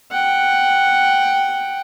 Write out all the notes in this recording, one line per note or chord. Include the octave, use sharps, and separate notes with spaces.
F#5 G5